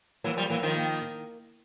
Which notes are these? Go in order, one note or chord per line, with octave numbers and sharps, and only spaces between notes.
E3 F#3 A#3
F3 G3
E3 F#3 A#3
D#3 F3
A#3
D#3